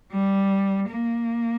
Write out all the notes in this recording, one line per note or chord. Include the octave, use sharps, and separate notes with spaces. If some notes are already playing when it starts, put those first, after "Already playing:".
G3
A#3